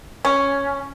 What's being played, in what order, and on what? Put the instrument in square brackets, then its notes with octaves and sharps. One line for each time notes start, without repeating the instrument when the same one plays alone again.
[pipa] C#4